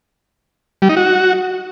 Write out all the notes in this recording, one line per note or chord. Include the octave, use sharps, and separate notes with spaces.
G3
D#4
F#4